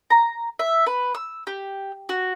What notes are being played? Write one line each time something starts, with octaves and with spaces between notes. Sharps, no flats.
A#5
E5
B4
E6
G4
F#4